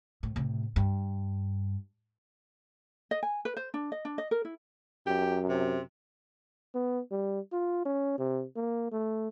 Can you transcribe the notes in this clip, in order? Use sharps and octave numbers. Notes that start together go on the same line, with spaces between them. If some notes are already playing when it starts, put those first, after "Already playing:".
A2
A2 C3
G2
D#5
G#5
B4
C5
D4
D#5
D4
D#5
A#4
E4
F#2 G4
C3
B3
G3
F4
C#4
C3
A#3
A3